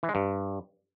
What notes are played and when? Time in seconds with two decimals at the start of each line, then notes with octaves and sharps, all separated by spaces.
0.03 E3
0.09 G#3
0.15 G2